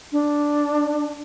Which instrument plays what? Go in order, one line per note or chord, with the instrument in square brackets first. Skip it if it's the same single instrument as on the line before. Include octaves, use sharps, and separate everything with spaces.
[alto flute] D4